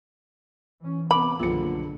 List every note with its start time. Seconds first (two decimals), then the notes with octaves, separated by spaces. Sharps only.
0.81 E3 C#4
1.11 C3 B3 B5 D6
1.39 F#1 B1 A2 D3 F3 A#3 F4 C#7